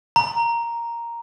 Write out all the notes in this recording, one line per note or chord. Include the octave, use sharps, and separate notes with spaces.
A#5